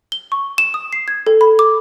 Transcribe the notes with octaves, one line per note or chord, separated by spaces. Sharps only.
G7
C#6
E7
D#6
C7
G#6
A4
B5
D6